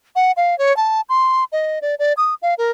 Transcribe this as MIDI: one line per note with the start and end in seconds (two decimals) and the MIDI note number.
0.16 0.32 78
0.37 0.57 77
0.58 0.75 73
0.77 1.01 81
1.09 1.44 84
1.52 1.79 75
1.82 1.95 74
1.99 2.13 74
2.17 2.34 87
2.42 2.54 77
2.58 2.71 70